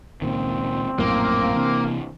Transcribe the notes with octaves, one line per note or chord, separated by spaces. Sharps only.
C#2 A#2 D#3 C4
A#1 F#2 A2 A#3
C3 E3